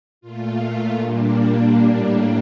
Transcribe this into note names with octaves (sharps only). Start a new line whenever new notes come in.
A#2 A3 F4
A#2 G3 A#3 D4
A2 G3 A#3